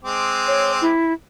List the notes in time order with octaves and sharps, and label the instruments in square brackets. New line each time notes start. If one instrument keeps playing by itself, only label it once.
[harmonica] G#3 C4 D6
[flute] C#5
E4